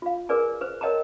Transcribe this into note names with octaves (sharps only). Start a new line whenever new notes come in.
F4 F5
G#4 A#4 B4 D5 G#5
B4 C5
A#4 C#5 D#5 G5 A5 A#5